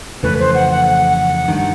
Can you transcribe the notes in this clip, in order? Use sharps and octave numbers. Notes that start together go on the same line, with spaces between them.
F2 C#3 E3 A3 B4
C5
F#5
F#5
F#5
G2 D#3